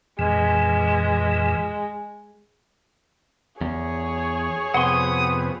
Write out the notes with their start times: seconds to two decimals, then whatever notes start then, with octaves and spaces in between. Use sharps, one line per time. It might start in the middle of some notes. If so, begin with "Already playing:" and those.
0.19 F2 A#2 E3 G#3
3.61 E2 G#4 C#5
4.74 F2 C3 B3 F#5 C6 D#6